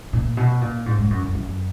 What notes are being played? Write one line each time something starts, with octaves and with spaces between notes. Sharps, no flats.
A#2
B2
A#2
G#2
G#2
F#2
F#2
F#2